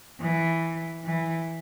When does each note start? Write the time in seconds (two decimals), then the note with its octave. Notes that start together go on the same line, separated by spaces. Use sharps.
0.22 E3
1.05 E3